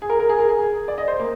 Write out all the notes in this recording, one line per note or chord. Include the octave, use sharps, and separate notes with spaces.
G#4
A#4
A#4
G#4
A#4
G#4
D5
D#5
C5
A#3